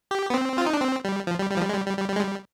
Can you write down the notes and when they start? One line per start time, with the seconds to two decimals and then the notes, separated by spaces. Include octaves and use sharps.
0.11 G4
0.30 B3
0.34 C4
0.58 F4
0.66 D#4
0.73 D4
0.81 C4
1.05 G3
1.27 F3
1.39 G3
1.51 G3
1.56 F3
1.62 G3
1.69 G#3
1.74 G3
1.86 G3
1.97 G3
2.09 G3
2.16 G#3
2.20 G3